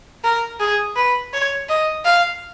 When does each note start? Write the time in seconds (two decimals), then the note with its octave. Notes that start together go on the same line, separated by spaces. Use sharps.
0.24 A#4
0.60 G#4
0.96 B4
1.33 C#5
1.69 D#5
2.05 F5